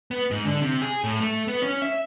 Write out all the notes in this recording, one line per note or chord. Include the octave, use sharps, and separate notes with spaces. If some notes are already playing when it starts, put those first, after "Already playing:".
B3
G#2
D3
C3
G#4
A2
A3
B3
C#4
E5